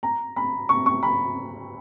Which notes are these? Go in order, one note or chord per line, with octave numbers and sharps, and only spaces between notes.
A#5
B5
C#6
C#6
B5